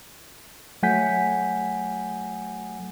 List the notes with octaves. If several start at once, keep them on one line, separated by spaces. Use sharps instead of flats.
F#3 A3 F#5 G#5 G6 B6